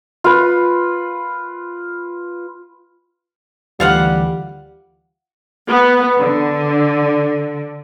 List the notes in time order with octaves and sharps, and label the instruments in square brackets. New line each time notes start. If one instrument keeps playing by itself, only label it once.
[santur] F4 B4
[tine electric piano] D2 D3 E3 [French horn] G3 [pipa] F4 F5 F#5
[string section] B3
D3